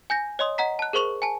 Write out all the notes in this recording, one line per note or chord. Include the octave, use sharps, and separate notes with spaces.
G#5 G6 A#6
C#5 D#5 C6 D#6
D#5 F#5 A#5 B6
A5 F#6
G#4 A#4 C5 C#6 F7 F#7
G#5 A5